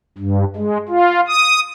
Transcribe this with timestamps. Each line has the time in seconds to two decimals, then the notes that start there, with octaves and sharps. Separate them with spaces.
0.18 G2
0.56 G#3
0.89 F4
1.28 D#6